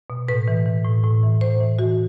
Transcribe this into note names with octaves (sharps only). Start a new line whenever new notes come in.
B2
A2 B4
E3
E3
A2
A2
E3
A2 C5
E3
E3 F#4